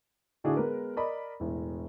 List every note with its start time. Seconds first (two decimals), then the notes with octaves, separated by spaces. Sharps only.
0.44 A2 D3 D4 E4 F#4 G#4
0.56 G#3 B3 A#4 B4
0.96 A#4 D5 D#5 A#5 B5
1.40 E1 A2